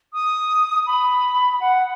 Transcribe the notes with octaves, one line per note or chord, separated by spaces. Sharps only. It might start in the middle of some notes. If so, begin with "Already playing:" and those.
D#6
B5
F#5